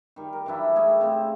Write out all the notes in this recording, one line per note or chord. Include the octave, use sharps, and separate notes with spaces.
D#3 G3
A#4
E3 F#3 D4 E4
G3 A3 D4 G#4
C#3 C4